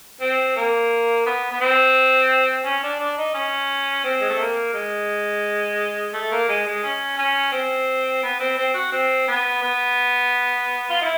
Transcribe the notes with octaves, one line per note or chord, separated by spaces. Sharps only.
C4
A#3
B3
B3
C4
C#4
D4
D4
D#4
C#4
C4
G#3
A3
A#3
G#3
A3
A#3
G#3
G#3
C#4
C#4
C4
B3
C4
C4
F#4
C4
B3
B3
F4
E4